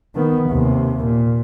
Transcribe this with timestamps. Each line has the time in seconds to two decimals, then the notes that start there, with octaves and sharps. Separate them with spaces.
0.15 D#3 B3
0.50 D#2 C3
1.05 A#2